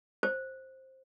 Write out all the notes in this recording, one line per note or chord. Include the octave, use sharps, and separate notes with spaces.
C5